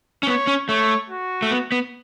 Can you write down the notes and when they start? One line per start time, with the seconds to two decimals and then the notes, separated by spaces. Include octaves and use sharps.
0.23 C#4
0.27 B3 C#5
0.47 C#4
0.69 A3 C#5
1.10 F#4
1.42 A3
1.51 B3
1.72 B3